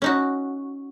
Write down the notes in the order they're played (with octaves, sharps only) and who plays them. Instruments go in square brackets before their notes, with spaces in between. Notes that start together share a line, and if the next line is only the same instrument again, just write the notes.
[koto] C#4 D#4 F#4